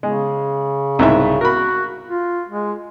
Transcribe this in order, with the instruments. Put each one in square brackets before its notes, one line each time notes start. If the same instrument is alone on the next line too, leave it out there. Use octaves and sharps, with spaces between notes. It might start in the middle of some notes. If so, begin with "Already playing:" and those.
[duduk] C#3 [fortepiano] G#3
[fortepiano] C2 G#2 E5
[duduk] F#4 [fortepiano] A#4 B5
[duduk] F4
G#3